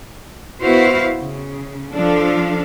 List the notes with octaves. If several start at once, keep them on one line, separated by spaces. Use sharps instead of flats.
B3 E4 F#4 B4 C5 F5
C#3
F3 D4 A4 F5